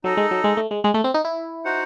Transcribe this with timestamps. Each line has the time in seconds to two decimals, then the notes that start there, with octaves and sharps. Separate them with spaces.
0.04 F#3 D#4 A4 D#5
0.17 G#3
0.31 F#3
0.44 G#3
0.57 A3
0.71 G#3
0.84 G#3
0.94 A3
1.04 C4
1.14 D#4
1.25 E4
1.65 D#4 F#4 C5 F#5